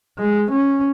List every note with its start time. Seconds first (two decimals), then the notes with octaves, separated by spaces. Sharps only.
0.19 G#3
0.51 C#4